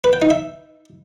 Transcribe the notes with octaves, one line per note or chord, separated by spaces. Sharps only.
B4
G5
D#4
E5